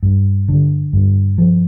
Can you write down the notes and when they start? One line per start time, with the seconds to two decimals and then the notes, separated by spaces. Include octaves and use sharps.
0.03 G2
0.49 D3
0.93 G2
1.38 F3